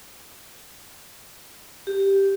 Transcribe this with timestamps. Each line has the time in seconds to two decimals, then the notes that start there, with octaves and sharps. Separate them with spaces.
1.87 G4